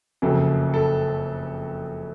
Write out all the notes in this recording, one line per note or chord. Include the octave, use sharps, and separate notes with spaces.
F#1 F2 C#3 F#3 A4
A4